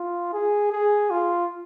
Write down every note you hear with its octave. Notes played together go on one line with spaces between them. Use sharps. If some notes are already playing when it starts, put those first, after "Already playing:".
Already playing: F4
G#4
G#4
F4